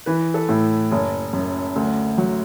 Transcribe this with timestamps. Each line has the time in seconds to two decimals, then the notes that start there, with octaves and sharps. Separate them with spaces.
0.06 E3 B4
0.34 A4
0.49 A2
0.92 F#1
1.33 F#2
1.76 D2
2.18 F#3